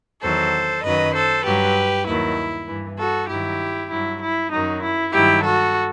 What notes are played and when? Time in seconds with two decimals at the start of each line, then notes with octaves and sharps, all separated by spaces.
0.23 E2 D#3 F#3 A4 C5
0.84 F#2 D#3 F#3 B4 D#5
1.15 A4 C5
1.45 G2 F#3 G4 B4
2.07 D#2 D#3 F#3 E4
2.68 G2 E3
2.99 F#4 A4
3.29 G2 D#3 F#3 E4 G4
3.91 G2 F#3 E4
4.22 E4
4.53 F#2 D#3 F#3 D#4
4.83 E4
5.13 G2 D#3 F#3 E4 G4
5.44 F#4 A4